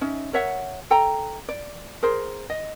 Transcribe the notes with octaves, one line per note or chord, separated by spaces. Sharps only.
C#4 D#4 E5
A#4 C#5 E5 F#5
A4 G5 A#5
D5
G#4 A#4 C5
D#5